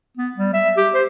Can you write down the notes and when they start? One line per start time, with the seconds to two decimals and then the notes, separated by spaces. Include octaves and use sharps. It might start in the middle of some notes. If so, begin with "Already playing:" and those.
0.17 B3
0.37 G3
0.53 E5
0.77 G4
0.94 C5